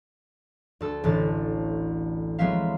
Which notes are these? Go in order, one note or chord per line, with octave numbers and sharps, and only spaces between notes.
D2 A4 E6
A1 A2 D3 A4 A6
F#3 G#3 B3 C4 E5 F5